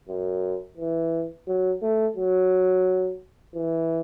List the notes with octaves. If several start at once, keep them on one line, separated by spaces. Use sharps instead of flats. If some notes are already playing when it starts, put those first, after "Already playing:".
F#2
E3
F#3
A3
F#3
E3